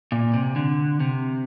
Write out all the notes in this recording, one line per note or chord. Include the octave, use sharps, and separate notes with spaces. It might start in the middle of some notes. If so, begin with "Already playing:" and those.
A#2
C3
D3
C3